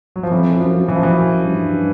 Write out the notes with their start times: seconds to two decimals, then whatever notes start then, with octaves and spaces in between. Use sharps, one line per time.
0.16 F#3
0.23 F3
0.31 F2 E3
0.59 F#2 F3
0.88 F#2 E3
0.96 F3
1.03 E3
1.46 G2